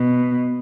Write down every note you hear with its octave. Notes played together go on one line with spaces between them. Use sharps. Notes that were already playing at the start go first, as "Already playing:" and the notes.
Already playing: B2